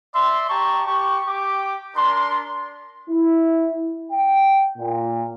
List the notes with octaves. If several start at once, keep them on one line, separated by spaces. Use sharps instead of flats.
D5 E5 C6
G4 A5 A#5 C#6
G4 C#6
G4 D6
D4 A#4 C6
E4
G5
A#2